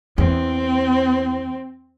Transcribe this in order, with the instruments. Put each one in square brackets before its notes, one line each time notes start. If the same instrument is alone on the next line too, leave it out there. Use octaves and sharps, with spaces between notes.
[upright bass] E2 [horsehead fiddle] C4